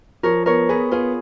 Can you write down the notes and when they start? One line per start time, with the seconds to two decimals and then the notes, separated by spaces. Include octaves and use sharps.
0.23 F3 A#4 C#5
0.46 B3 A#4 C#5
0.69 B3 G#4 B4
0.91 B3 F4 G#4